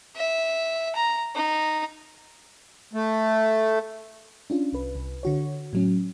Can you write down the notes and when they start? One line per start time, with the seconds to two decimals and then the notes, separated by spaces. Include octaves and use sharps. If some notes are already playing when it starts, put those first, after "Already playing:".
0.16 E5
0.95 A#5
1.35 D#4
2.93 A3
4.50 C#4 D4 F4
4.73 C2 B4
4.95 C2
5.23 D3 F#4 C#5
5.73 A2 F#3 C#4